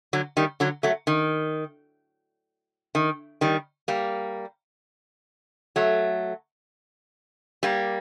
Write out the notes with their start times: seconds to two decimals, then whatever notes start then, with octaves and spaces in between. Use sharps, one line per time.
0.13 D3 F#3
0.37 D#3 G3
0.60 D3 F#3
0.83 F#3 A3
1.07 D#3
2.95 D#3
3.41 D#3 G3
3.88 G3 A#3
5.76 F#3 A3
7.63 G3 A#3